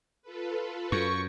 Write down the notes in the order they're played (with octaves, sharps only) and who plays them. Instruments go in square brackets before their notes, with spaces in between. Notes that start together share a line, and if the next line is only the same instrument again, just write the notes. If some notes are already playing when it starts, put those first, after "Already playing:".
[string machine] F4 A4 B4
[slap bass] F#2 [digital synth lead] C#6